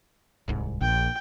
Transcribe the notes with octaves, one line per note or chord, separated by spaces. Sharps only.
D1 C2 G#2
A#1 A#2 G5